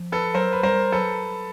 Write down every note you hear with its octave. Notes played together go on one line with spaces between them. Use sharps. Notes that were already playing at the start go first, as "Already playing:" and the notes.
Already playing: F3
A4 B4
F#3 A#4 C5
B4
G3 A#4 C5
F#3 A4 B4